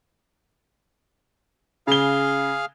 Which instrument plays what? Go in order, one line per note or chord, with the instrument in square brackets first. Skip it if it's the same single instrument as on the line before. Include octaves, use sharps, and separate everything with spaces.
[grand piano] C#3 G7 [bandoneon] G#4 F5 F6